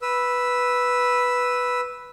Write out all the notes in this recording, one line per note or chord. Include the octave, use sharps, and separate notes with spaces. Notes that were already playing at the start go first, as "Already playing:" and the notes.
B4 E6